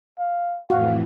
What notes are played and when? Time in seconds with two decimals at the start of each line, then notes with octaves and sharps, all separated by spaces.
0.19 F5
0.70 F2 A2 E3 F#4 F5